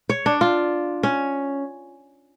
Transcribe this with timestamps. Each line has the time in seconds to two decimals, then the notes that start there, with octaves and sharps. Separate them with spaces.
0.10 C#5
0.26 D4
0.41 F4
1.03 C#4